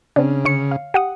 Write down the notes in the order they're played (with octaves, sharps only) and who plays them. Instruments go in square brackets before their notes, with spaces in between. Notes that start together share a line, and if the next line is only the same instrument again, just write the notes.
[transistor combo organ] C#3 [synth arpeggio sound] C4 D4
[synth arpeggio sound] D3 C#5 C#7
F5
G4 F#5 D#6